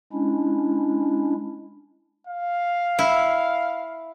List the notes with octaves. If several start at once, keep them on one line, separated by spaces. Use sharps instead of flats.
G#3 C#4 D4 E4
F5
E4